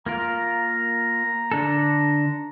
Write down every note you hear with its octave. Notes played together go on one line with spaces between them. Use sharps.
A#3 F4 A#4 A#5
D3 D4 A4